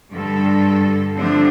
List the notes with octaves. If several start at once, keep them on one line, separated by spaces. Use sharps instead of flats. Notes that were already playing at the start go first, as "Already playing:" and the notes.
G2 D3 A4
D3 F3 G3 A3 C4 D4